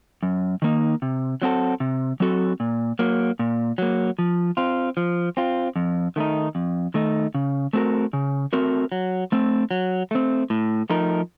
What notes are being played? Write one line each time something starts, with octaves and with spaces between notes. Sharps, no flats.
F#2
D#3 A#3 D#4
C3
F#3 C4 F#4 A4
C3
F#3 C4 F#4 A4
A#2
F#3 A#3
A#2
F#3 A#3
F3
C4 F4
F3
C4 F4
F2
D#3 A3 D#4
F2
D#3 A3 D#4
C#3
A3 C4 F#4 A#4
C#3
A3 C4 F#4 A#4
F#3
A3 C4
F#3
A3 C4
A2
F3 A3 D#4 A#4